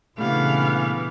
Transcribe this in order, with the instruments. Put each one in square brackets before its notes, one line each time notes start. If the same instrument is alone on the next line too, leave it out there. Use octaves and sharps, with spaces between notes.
[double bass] A#2 C#3 [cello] E3 B3 [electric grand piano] A3 D4 G4 [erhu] F5